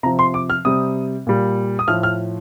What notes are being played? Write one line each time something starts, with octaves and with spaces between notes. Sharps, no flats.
C3 F3 A#5
C6
D6
F6
C3 G3 D#6
A#2 G3
D#6
A2 F3 F6
F6